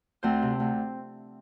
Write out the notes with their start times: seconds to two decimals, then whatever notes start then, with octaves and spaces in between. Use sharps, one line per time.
0.23 D2 C4 C5
0.42 C3
0.60 D2